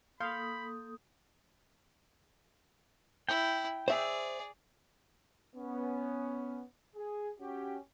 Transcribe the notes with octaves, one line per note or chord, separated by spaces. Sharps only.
A#3 A4 F5 B5 C6 D#6 G6
E4 G5
G#4 C5 D5 E5
B3 C#4
G#4
C#4 F#4 G4